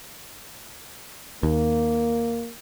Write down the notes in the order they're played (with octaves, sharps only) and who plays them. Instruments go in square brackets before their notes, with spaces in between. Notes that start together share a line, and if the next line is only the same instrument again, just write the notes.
[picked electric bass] D#2 [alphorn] A#3